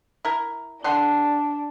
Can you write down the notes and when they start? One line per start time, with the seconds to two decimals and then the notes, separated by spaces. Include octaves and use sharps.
0.25 E4 A#4
0.84 D3 D4 F#5 C6